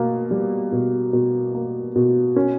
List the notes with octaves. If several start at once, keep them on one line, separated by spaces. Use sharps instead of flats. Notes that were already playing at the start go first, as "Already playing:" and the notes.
Already playing: B2 A#3
G3
B2
B2
A#3
B2
C#4